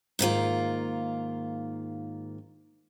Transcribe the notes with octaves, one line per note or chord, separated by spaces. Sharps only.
G#2 D#3 A#3 F4